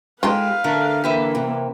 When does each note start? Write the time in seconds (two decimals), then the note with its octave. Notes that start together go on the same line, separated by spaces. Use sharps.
0.23 G#3 D#4 F4 G4 B4 F5
0.64 D3 A3 A#4
1.04 E3 A#3 G4 B4 E5
1.35 C3